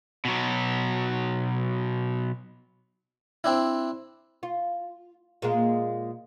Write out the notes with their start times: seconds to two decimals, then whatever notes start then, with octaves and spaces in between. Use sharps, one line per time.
0.25 B2 F#3
3.44 C4 D4 E4
4.43 F4
5.42 A#2 G#3 A#3